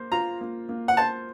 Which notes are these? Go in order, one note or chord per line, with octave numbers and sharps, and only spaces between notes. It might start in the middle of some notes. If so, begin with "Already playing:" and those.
Already playing: A#3 C5
F4 A#5
A#3
A#3
F#5
C5 A5